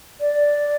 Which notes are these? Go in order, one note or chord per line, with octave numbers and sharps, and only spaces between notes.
D5